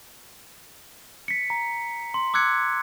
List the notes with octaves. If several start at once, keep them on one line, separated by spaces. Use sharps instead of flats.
B6 C#7
A#5
C6
D6 E6 F#6 G#6 C#7